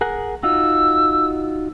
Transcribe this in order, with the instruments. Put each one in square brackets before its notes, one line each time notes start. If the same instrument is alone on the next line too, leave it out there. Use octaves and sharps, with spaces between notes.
[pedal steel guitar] G#4 A#4 F#5
[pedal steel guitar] D#4 F4 F#4 [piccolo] E6